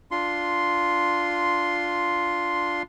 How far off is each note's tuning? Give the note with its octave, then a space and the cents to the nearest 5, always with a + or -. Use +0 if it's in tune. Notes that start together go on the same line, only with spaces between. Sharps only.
D4 +0 F4 +0 C6 +0